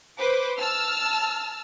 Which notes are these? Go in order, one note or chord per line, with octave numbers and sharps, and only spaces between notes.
B4 C5 D6
A5 E6 F6